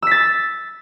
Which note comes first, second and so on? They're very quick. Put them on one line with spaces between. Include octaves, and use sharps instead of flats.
E6 B6 A6